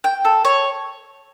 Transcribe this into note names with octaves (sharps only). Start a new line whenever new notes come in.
G5
A4
C#5